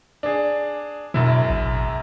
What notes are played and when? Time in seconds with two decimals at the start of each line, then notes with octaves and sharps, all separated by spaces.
0.23 D4 G#4
1.14 E1 F#2 B2 E4
1.50 A1